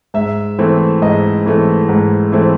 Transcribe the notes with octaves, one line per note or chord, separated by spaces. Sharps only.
G#2 E5
E3 A3 C4
G#2 D#5
E3 A3 C4
G#2
E3 A3 C4